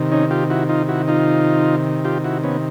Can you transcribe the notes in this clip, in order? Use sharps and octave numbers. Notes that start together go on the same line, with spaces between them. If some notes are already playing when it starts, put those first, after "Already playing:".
Already playing: C3 D#3
C#4 D#4
F4 G4
E4 F#4
D#4 F4
E4 F#4
D#4 F4
F4 G4
E4 F#4
B3 C#4